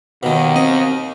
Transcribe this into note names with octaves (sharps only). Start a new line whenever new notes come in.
D#2 B2 D#3
C4 D#5